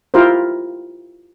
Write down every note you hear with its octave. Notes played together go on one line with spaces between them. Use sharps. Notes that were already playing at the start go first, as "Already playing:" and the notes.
E4 F4 G4 A#4 C5